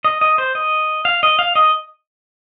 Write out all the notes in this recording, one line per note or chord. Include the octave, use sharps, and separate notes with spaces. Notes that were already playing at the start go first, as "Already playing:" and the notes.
D#5
D#5
C5
D#5
F5
D#5
F5
D#5